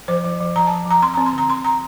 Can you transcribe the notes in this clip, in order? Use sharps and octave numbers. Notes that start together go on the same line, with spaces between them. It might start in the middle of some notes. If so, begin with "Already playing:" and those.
F3 C5
F3
F3
F3 A#5
F3 A5
F3 A#5
C4 C6
C4 A#5
C6
D3
A#5
C4 C6
C4 A#5